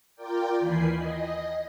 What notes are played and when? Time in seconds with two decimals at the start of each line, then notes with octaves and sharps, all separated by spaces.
0.15 F4 A#4 D5 G5
0.59 D#2 E3 G#5 B5 C7
0.95 D#5